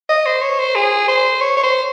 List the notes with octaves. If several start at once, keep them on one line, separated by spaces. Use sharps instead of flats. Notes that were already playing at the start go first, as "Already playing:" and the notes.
D#5
C5
C#5
C5
G#4
C5
C#5
C#5
C5